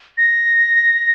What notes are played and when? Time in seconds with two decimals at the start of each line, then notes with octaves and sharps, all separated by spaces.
0.18 A#6